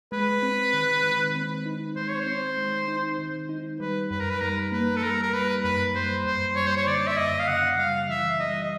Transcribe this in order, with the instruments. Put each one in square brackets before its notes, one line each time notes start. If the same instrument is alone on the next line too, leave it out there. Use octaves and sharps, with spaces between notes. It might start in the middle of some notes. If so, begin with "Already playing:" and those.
[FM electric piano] G#3 [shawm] B4
[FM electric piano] C4
D#3
D#3
C4
D#4
[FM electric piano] G#3 [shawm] C5
[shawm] C#5
C5
[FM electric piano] C4
G#3
D#4
D#3
D#4
[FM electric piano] G3 [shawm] B4
[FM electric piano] F#2 [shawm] B4
[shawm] A#4
B4
[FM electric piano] G3 [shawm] A#4
[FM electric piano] A#3 [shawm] B4
[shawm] A4
[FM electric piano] G3 [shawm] A#4
[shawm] A#4
[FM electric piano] G3 [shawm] B4
[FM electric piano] F#2 [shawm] B4
[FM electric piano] G3 [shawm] C5
[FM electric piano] F#2 [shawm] C5
[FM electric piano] G3 [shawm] C#5
[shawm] C5
C#5
[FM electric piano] D3 [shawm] D5
[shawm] E5
[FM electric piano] F#2 [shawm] D#5
[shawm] F5
[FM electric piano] C#3 [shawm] F#5
[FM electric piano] G3 [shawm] F5
[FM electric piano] E3 [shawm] E5
[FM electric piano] G3 [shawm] D#5
[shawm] D#5